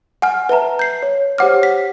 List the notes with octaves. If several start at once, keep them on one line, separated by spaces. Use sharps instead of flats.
F#5 G#5 F6
B4 E5 A5 A#5
G6 C7
C#5
G4 C5 C#5 F#5 D6 F6
B6